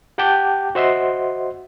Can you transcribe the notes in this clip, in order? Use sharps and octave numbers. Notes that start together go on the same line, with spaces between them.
G4 F#5 G5 A5 D6 G6
F#4 C5 D#5 E5 F#5 C6